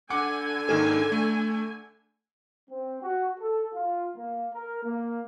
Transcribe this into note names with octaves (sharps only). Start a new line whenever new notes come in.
D3 F#5 G#5 D6 C#7
G#2 D#3 A#3 A4
A3
C4
F#4
A4
F4
A#3
A#4
A#3